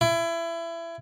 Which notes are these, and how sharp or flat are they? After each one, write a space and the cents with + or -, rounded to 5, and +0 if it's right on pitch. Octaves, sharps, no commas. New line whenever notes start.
E4 +25